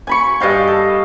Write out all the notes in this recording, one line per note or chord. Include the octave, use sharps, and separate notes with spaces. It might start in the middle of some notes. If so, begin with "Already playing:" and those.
G#5 B5 C#6
G2 D#5 F5 G5
A4